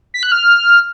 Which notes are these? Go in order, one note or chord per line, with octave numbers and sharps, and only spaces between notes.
B6
F#6
F6